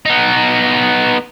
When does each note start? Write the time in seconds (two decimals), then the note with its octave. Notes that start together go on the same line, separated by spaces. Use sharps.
0.06 B3 D#4